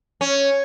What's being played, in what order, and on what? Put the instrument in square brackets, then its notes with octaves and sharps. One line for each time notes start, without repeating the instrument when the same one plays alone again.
[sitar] C#4